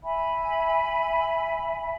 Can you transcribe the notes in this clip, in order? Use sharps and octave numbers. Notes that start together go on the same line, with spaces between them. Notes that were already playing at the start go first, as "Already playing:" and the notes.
E5 G#5 B5